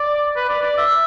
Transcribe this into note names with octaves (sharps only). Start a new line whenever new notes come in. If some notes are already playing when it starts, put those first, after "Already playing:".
Already playing: D5
B4
D5
D5
E5